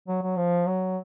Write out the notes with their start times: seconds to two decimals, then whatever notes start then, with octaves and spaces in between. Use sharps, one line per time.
0.08 F#3
0.23 F#3
0.37 F3
0.67 F#3